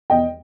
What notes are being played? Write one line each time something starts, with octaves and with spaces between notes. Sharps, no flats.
E2 D#5 G5